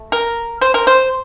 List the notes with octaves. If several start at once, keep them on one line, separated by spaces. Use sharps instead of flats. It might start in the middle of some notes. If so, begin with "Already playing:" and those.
Already playing: A3
A#4
C5
A#4
C5